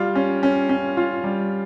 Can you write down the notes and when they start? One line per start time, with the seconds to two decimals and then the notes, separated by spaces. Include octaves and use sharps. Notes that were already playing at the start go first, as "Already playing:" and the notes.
Already playing: G3 F4
0.15 C#4
0.43 C#4
0.69 C#4
0.97 F4
1.24 G3